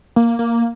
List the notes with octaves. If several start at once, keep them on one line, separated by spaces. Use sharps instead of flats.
A#3
A#3